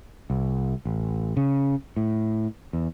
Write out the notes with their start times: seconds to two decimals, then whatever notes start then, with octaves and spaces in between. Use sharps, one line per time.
0.30 C2
0.85 A1
1.37 C#3
1.96 A2
2.73 E2